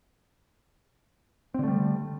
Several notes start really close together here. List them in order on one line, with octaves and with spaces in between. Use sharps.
C4 D3 A3 G3